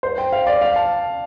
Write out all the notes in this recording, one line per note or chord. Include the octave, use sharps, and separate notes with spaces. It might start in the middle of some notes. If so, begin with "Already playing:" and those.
C5
G5
F5
D5
F5
A5